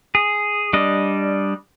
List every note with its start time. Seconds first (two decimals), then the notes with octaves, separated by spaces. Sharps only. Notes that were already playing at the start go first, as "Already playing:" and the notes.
0.15 G#4
0.73 G3 D4 D#5